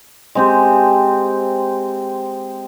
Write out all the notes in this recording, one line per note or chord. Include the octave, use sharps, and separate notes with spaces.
G#3 C4 G4